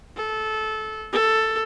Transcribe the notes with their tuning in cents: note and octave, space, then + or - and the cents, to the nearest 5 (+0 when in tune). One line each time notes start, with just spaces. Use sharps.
A4 -20
A4 +10